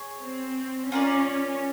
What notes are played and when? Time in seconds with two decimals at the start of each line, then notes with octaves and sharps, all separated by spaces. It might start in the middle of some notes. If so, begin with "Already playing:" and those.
Already playing: G#4 C#5
0.22 C4
0.91 C#4 F4 A#4 D5